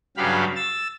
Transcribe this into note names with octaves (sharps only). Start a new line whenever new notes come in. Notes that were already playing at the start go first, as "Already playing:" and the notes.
G2 C#3 F#3 G4 F5 B5
E6 A6